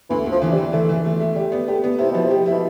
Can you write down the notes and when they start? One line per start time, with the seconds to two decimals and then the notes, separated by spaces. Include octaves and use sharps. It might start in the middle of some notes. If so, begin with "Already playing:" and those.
0.10 D2 E3
0.26 D2
0.32 F3
0.42 E3
0.52 G3
0.57 E3
0.73 E3 A3
0.89 E3
1.05 A3
1.20 A3
1.36 G3 G4
1.52 B3
1.67 D3 G4
1.84 B3
1.99 C3 E4
2.11 B2 F3
2.25 C3
2.30 G4
2.46 E4
2.52 B2